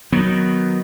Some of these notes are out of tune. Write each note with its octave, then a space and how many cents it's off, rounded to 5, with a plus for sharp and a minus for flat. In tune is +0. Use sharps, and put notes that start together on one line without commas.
D#3 +0 F#3 +0 B3 +0